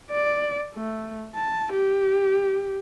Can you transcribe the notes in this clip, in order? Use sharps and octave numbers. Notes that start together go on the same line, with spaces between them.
D5
A3
A5
G4